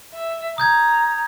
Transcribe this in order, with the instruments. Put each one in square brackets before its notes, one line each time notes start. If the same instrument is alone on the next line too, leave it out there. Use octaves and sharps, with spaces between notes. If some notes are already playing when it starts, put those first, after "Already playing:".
[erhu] E5
[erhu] A#5 [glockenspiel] D#6 G6 G#6